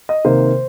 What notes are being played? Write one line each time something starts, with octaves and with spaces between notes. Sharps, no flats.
D#5
C3 D#3 A#3 C5